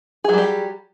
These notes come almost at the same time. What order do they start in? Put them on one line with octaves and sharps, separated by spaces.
G#4 F#3 G3 G4